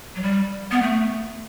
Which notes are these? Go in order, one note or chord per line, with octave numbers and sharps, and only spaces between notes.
F#3
G3
B3
A3